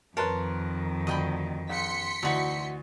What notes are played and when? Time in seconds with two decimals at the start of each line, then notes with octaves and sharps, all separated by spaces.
0.17 F2 D#3 A#4 B4 C#5 A5 C6
1.07 D2 D#5 G5 B5
1.70 A#1 C6 B6 C#7
2.23 D2 E3 D#4 F#4